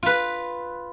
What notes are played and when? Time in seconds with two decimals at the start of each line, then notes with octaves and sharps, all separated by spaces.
0.03 F4 B4